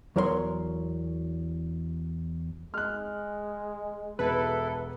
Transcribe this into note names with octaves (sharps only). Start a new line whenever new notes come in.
E2 F#3 A#4 C#5 F5 C6
G#3 F6 F#6
E1 E4 A4 B4